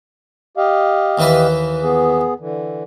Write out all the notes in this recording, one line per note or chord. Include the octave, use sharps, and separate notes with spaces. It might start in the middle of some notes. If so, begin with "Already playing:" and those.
G4 D#5 F5
D#2 E3 B4
B3 G#4
D3 E3